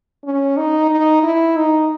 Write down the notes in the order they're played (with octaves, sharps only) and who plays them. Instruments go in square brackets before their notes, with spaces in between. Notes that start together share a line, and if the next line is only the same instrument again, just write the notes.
[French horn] C#4
D#4
D#4
E4
D#4